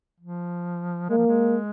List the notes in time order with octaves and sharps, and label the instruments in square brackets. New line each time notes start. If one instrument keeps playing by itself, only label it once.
[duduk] F3
[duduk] G#3 [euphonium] A#3
[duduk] F3
G#3